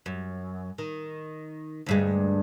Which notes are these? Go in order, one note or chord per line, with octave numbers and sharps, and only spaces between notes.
F#2
D#3
D2 G2 G#3